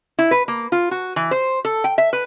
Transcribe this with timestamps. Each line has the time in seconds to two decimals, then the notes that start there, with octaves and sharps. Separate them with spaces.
0.19 E4
0.31 B4
0.48 A#3
0.72 F4
0.91 F#4
1.16 E3
1.31 C5
1.65 A4
1.84 G5
1.98 E5
2.13 B4